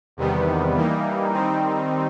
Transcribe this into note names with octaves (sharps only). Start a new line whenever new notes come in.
E2 C3 D#3 G3 B3
E3 G3 A#3 D#4
D#3 G3 C4 D#4